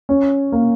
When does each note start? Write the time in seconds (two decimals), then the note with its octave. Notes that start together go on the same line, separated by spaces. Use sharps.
0.09 C#4
0.52 A#3